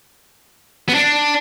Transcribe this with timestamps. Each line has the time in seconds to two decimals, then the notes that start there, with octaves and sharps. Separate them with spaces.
0.89 B3
0.95 D4